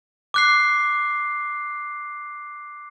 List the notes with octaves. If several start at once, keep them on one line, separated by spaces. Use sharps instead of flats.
D6 F#6 C7